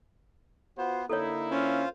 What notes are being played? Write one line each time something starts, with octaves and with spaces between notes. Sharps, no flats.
B3 F4 F#4 C5
D3 A#3 D#4 E4 A4 C#5
C#4 F4 C5 F5